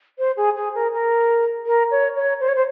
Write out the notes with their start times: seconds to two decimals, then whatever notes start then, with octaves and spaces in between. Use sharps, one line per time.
0.19 C5
0.37 G#4
0.56 G#4
0.75 A#4
0.93 A#4
1.66 A#4
1.91 C#5
2.16 C#5
2.40 C5
2.48 C#5
2.55 C5